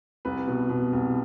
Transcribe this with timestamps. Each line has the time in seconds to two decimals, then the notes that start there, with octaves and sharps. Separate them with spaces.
0.25 C2 B4
0.47 B2
0.69 B2
0.93 C2